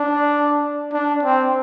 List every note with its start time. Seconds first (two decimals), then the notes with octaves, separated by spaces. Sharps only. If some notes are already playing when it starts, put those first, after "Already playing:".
Already playing: D4
0.93 D4
1.23 C4